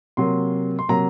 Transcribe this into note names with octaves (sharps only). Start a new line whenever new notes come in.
C3 F#3 A#3 C6
C6
C3 F#3 A#3 A#5